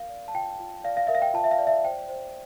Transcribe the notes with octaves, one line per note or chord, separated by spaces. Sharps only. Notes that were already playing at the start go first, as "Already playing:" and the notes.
Already playing: A#4 F5
D5
A5
F4 G5
F4
D5 F5
F5
A#4 E5
F5
G5
F4 A5
E5
F5
D5
E5
C5 G5
C5